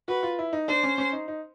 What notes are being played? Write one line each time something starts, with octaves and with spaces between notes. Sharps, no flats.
F#4 B4
F4
E4
D#4
D4 C5
C#4
C#4
D#4
D#4